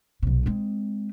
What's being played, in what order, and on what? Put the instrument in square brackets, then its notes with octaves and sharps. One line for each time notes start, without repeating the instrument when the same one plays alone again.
[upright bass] B1 C3
G#3 C4